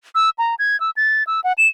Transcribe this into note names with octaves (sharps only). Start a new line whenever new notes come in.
E6
A#5
G#6
E6
A6
E6
F#5
E7